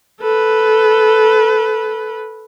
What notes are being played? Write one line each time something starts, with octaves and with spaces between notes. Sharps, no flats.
A4 B4